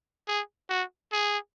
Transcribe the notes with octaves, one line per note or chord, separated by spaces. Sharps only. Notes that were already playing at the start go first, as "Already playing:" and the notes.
G#4
F#4
G#4